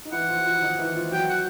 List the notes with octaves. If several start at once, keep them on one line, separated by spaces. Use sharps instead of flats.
D#4
E3 E4 F#5
F3 F4
F#4
F3 F4
E4
D#3 D#4
E3 E4
F3 F4
F#3 F#4 G5
F#5